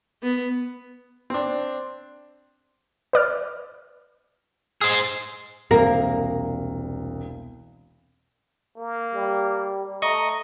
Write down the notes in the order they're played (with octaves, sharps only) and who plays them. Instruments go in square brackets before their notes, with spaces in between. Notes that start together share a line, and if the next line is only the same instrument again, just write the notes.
[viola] B3
[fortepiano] C4 D4
[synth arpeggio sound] B4 D5 F6
[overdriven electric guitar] G#4 C5 [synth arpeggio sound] D#5 D#6
[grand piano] E1 C2 [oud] A#3
[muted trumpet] A#3
[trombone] G3
[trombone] A3 [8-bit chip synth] D#5 C#6 [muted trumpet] A#5